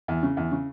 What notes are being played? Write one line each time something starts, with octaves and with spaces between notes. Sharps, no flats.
E2
C#3
E2
C#3